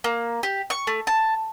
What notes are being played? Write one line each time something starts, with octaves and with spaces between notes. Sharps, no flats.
A#3
G4
C#6
A3
A5